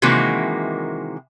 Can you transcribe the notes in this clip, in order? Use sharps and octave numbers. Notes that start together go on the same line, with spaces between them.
C3 D#3 E3 G#3 A#3 F#4